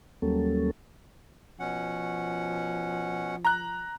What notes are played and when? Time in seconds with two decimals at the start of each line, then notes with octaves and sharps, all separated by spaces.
0.22 D#2 F#3 G3 A#3 C#4 A4
1.59 B2 F3 C#4 F#5
3.45 A#5 F#6